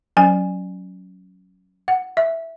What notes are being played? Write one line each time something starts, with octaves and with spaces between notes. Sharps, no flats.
F#3 C#4 G#5
F#5
E5